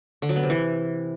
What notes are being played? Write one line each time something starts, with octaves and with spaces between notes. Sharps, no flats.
D3
F#3
B3
C3
E3